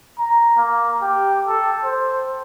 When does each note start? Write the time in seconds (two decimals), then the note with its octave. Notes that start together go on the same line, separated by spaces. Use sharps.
0.18 A#5
0.57 A#3
1.02 G4
1.47 A4
1.84 C5